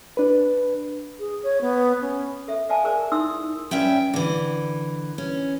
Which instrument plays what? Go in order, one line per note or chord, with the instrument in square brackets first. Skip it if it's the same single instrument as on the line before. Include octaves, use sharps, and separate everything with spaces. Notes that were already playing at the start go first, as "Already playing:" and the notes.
[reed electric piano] D4 B4
[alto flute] G#4
C#5
B3
C#4
[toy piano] A4 E5
D5 E5 F5 G#5 A5
G#4 A#4 C5 D5
D#4 E4 C6 D#6 E6
[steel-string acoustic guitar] G2 C#4 E5 G5
D3 E3
C#4